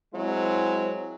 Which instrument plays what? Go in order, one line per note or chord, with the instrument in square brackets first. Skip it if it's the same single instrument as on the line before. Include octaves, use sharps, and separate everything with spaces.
[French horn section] F#3 G#3 C4 E4